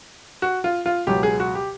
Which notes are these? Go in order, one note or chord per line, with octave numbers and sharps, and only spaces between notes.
F#4
F4
F4
C#2 B2 F#3 G4
G#4
F#4
G4